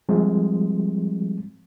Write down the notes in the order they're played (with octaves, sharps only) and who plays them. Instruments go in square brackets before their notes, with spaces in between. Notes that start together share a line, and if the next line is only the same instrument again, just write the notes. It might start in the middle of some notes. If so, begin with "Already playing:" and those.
[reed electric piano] F3 G3 G#3 C4